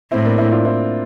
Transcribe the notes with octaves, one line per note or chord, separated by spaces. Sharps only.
A2 C4 E4
A#3 D4
C4 E4
D4 F4
C4 E4